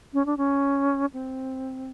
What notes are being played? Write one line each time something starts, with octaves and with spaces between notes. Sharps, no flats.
C#4
D4
C#4
C4